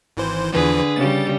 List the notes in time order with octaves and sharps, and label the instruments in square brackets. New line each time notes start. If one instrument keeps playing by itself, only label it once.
[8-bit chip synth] G#1 E3 C5
[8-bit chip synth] E2 E3 F3 [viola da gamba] D3 G#4 B4
[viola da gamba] C#3 G3 [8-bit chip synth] A6